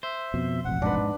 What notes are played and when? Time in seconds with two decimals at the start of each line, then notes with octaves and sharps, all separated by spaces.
0.03 C5 E5
0.34 F2 B2
0.65 E1 A1 F2 F#5
0.82 G#2 D4 B4